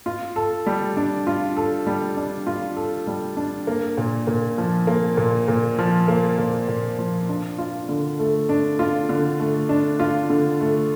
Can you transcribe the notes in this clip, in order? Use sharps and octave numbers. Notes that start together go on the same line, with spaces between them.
F4
A4
G3
D4
F4
A4
G3
D4
F4
A4
G3
D4
A#3
A#2
A#2
F3
A#3
A#2
A#2
F3
A#3
A#2
A#2
F3
D4
F4
D3
A3
D4
F4
D3
A3
D4
F4
D3
A3